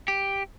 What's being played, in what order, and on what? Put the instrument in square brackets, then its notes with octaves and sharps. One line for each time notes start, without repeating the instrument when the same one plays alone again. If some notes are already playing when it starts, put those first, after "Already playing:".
[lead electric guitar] G4